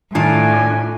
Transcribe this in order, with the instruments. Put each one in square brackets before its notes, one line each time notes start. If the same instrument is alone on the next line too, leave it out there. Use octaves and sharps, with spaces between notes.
[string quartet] A2 [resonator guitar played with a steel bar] D#3 F4 [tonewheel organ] D4 [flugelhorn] G#5